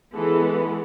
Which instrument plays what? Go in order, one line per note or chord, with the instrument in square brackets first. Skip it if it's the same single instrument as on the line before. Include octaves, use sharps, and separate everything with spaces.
[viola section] E3 G#3 B3 A4